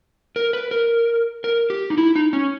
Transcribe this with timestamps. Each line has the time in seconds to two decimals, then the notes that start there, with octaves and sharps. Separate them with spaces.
0.36 A#4
0.53 B4
0.71 A#4
1.44 A#4
1.70 G4
1.90 D#4
1.98 E4
2.16 D#4
2.33 C#4